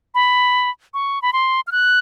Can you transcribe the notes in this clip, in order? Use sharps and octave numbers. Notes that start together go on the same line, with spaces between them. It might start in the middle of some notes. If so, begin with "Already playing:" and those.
B5
C#6
B5
C6
F6
F#6